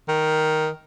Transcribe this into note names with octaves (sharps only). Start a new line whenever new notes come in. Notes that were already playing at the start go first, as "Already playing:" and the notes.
D#3